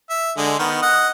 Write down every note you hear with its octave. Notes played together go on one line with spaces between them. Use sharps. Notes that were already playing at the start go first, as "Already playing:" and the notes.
E5
D3 G#3
D#3 B3
D#5 F#5